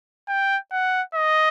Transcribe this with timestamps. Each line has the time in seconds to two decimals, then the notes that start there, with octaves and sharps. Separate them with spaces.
0.28 G5
0.72 F#5
1.15 D#5